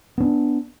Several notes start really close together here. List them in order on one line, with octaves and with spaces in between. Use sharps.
B3 C#4 D4